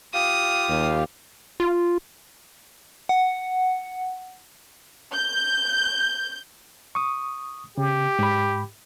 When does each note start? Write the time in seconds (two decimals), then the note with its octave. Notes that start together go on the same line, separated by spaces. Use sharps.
0.14 F4 G4 F5 D#6
0.69 D#2
1.60 F4
3.09 F#5
5.14 G6
6.95 C#6 D#6
7.78 C#3 G4
8.19 G#2 B5